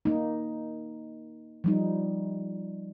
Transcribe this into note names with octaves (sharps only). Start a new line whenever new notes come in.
A#3 D#4
F3 G3 D#4